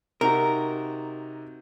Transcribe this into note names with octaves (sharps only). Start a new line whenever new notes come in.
C3 D#4 F#4 A#4